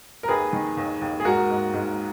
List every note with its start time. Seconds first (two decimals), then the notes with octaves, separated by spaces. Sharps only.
0.23 A#4
0.28 D#2 G#4 B4
0.53 D#3
0.77 D#2
1.01 D#2
1.20 G#4
1.25 G#2 F#4 A#4
1.50 G#2
1.74 G#2